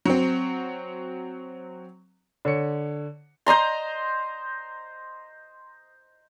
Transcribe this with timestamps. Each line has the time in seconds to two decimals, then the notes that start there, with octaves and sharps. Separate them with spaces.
0.06 F#3 C4
2.45 D3 C#5 C#7
3.46 C5 D#5 A#5 C6